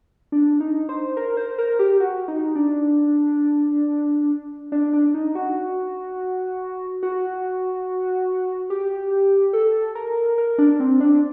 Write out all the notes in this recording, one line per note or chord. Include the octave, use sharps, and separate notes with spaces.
D4
D#4
C5
A#4
C5
A#4
G4
F#4
D#4
D4
D4
D4
D#4
F#4
F#4
G4
A4
A#4
A#4
D4
C4
D4